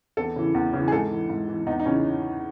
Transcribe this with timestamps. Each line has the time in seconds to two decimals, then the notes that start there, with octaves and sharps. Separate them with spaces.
0.17 E2 A4
0.36 C#3 E3
0.55 E2
0.73 C#3 E3
0.88 G#4
0.92 G#2 A4
1.11 E3
1.29 G#2
1.48 E3
1.67 E2 D#4
1.80 D#4
1.86 C#3 E3 C#4